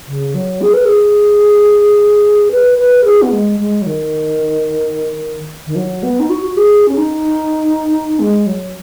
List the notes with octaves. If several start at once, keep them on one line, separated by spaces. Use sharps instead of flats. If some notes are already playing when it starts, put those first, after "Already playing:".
C#3
F#3
G#4
B4
G#4
B4
B4
G#4
B3
G#3
G#3
F#3
D#3
D#3
F#3
B3
D#4
F#4
F#4
G#4
C#4
D#4
G#3
F#3